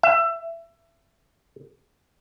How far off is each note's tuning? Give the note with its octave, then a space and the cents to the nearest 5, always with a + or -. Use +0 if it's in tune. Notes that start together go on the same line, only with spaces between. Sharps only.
E5 +25